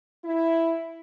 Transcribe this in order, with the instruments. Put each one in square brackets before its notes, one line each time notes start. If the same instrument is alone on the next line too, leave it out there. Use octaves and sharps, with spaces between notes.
[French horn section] E4